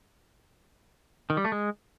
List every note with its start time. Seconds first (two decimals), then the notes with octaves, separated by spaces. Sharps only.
1.30 D#3
1.37 G3
1.45 A3
1.52 G#3